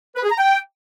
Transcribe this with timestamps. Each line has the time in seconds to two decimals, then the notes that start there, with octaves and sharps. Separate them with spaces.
0.15 B4
0.23 G#4
0.30 A#5
0.38 G5